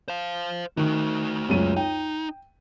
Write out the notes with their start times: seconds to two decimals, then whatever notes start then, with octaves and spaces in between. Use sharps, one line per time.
0.08 C5 F5
0.77 D#3 A3 F#4
1.49 C#2 F#2 D#7
1.76 D#4 G5